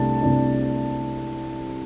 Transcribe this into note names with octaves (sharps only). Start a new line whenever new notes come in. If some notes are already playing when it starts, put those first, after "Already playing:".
Already playing: C2 C3 A3 D4 A5
C2 C3 A3 D4